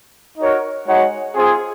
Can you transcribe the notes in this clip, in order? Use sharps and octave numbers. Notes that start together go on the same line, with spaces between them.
D#4 F#4 A#4 C#5
G#3 D#4 F#4 C#5 F#5
C4 F4 G#4